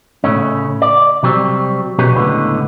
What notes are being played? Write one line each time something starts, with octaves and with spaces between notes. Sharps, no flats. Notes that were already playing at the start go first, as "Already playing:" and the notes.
A2 C#3 A3 C#4
D5
C3 F#3 G3 C4
B2 F#3 B3 C#4 G4 G#4
C#2 A2 D3 B3